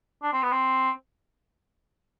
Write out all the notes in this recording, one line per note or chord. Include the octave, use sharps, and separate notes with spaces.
D4
C4
B3
C4